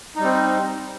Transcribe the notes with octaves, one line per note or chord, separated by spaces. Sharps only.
G3 C4 D#4